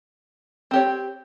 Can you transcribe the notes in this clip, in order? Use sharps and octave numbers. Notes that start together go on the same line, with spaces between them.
C4 G4 C#5